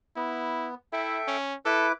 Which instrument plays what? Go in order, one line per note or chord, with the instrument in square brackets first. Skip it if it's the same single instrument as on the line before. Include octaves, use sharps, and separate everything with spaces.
[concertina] B3 [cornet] E4
[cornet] E4 [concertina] A4 E5 G5
[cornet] C#4
[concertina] E4 B4 D6 [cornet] A4